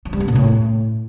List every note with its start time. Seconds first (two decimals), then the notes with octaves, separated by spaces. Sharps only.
0.05 F3
0.13 G3
0.20 B3
0.28 A#2
0.35 A2